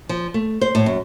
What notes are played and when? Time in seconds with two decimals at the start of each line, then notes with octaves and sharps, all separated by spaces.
0.09 F3
0.34 A3
0.61 C5
0.75 A2
0.86 F#2